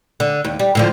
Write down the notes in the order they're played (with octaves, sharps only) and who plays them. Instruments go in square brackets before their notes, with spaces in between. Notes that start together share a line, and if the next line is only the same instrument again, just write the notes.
[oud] D3
D#2
G3
A2 D3 F3